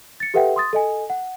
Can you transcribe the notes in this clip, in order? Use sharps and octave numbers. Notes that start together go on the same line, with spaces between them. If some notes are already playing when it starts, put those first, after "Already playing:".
A6 C#7
G4 A4 B4 E5 F#5 G5
C6 D#6 A6
A4 D#5 G#5
F#5